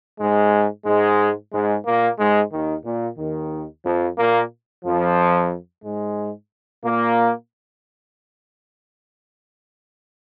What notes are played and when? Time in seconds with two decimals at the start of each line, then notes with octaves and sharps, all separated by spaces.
0.20 G#2 G#3
0.86 G#2 G#3
1.53 G#2 G#3
1.86 A#2 A#3
2.19 G#2 G#3
2.52 D#2 D#3
2.85 A#2
3.19 D#2 D#3
3.84 F2 F3
4.18 A#2 A#3
4.85 F2 F3
5.84 G#2 G#3
6.83 A#2 A#3